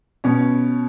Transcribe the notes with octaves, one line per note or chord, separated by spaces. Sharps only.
B2 C#4